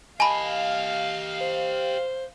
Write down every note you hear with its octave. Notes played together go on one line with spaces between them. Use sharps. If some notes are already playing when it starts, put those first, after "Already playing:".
G4 D#5 F5 G#5 A5 B5
C5